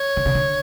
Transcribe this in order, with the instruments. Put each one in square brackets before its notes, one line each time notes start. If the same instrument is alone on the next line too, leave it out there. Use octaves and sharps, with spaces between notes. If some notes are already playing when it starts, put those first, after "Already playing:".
Already playing: [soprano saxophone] C#5
[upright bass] D3
C#3
D3